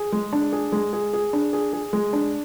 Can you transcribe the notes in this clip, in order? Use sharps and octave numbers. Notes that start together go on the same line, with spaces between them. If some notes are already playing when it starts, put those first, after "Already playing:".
Already playing: G#4
G#3
D4
G#4
G#3
G#4
G#4
D4
G#4
G#4
G#3
D4